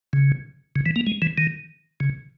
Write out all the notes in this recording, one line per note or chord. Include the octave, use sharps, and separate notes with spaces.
C#3
C#3
E3
A#3
G#3
E3
D#3
C#3